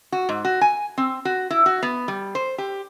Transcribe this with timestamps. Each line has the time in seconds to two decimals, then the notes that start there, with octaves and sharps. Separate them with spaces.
0.12 F#4
0.29 G#2
0.45 F#4
0.61 G#5
0.98 C4
1.25 F#4
1.50 E4
1.66 F#4
1.83 B3
2.08 G3
2.35 C5
2.58 G4